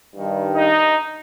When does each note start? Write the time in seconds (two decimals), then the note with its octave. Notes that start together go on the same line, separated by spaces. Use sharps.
0.16 G2 D#3
0.54 D#4